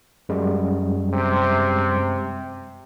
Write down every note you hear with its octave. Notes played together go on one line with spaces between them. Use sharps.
F#2 G3 G#3
C3